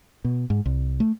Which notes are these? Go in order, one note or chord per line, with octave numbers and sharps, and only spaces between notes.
B2
G#2
C2
A3